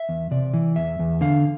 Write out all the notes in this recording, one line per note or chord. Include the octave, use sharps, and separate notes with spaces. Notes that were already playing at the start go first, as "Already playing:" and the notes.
Already playing: E5
E2
C3 D5
E3
E2 E5
E2
D3 F5